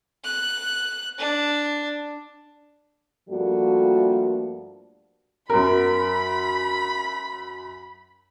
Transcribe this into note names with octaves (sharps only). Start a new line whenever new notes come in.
F#6
D4
G2 F3 G3 A3 A#3 F#4
F#2 A#4 B5